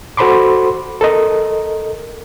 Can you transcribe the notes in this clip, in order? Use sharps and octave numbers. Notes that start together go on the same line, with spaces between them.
F#4 A4 C5 B5 C6 D6
A4 A#4 D#5